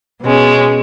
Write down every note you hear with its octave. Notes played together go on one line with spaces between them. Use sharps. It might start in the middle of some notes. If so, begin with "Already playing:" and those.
B2 G#3 C#4